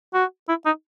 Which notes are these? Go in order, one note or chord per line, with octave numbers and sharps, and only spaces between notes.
F#4
E4
D#4